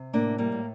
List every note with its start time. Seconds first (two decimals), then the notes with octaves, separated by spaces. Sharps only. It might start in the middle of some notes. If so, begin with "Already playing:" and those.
Already playing: C3
0.13 A2 A#3 D4
0.38 G3 A#3
0.52 A2